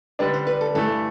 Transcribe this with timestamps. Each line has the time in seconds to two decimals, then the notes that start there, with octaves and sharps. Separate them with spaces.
0.19 D3 G3 D4 B4
0.33 C5
0.47 B4
0.61 A4
0.75 G2 E3 A3 A4